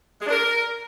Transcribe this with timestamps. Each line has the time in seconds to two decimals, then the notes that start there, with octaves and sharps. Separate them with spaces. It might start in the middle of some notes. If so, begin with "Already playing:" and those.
0.20 G#3
0.26 D4
0.31 A#4